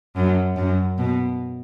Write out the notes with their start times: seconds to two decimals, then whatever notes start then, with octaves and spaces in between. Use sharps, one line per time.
0.16 F#2
0.56 F#2
0.98 B2